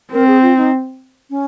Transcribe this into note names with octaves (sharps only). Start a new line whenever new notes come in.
C4 A#4
G#4
F4
D#4
C#4